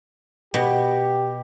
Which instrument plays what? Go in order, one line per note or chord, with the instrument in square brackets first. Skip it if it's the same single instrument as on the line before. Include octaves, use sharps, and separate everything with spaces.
[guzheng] B2 [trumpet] G4